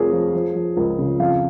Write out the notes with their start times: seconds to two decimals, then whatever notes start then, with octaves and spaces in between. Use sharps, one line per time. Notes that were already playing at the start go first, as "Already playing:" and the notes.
Already playing: F1 F2 F3 G#4 A#4 C#5
0.12 F3
0.34 F3
0.55 F3
0.76 C#2 A#4
0.99 C#3
1.19 F2 F5